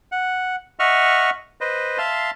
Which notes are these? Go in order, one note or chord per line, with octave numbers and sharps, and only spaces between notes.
F#5
D#5 E5 F#5 C#6 F6
B4 C5 D#5
E5 F5 A5 C6